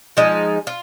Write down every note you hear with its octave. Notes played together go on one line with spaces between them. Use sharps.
F3 G#3 D#4
F4